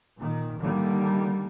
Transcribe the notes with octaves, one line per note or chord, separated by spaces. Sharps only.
A#2 D#3
D3 D#3 G3 A#3